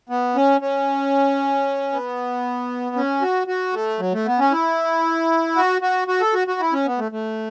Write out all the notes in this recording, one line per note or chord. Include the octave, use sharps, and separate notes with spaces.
B3
C#4
C#4
B3
C#4
F#4
F#4
A3
F#3
A3
B3
C#4
E4
F#4
F#4
F#4
A4
F#4
F#4
E4
C#4
B3
A3
A3